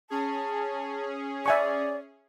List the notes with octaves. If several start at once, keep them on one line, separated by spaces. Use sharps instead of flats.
C#4 G#4 A5
D5 E5 G#5 C#6